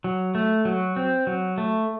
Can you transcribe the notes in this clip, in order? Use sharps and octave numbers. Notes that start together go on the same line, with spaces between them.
F#3
A3
F#3
C4
F#3
A3